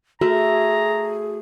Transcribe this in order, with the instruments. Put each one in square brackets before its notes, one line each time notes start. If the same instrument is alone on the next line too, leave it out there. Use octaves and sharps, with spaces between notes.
[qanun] A3 [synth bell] F#4 [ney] G#4 [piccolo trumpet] A#5